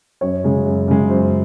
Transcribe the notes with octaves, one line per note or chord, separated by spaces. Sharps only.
F#2 C#5
C#3 G#3
F#2
C#3 G#3
F#2 C5